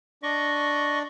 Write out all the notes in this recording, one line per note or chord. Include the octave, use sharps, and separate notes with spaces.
D4 D5 D#5 C#6